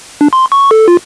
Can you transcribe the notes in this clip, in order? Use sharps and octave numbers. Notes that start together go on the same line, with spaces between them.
D4
C6
C#6
A4
F4